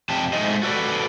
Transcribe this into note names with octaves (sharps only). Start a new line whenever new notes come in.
F2 C3 G4 A5
G#3 A3 D#4 C5 D#5
F#4 A4 B4 D5